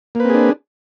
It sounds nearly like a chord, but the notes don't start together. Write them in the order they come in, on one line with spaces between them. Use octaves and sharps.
A#3 B4 C4 G#4 D4